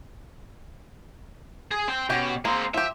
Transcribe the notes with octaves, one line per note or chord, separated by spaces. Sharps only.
G#4
C4 G5
B2 C#4 F#4 G4
G#3 A#3 C4
F3 G4 E5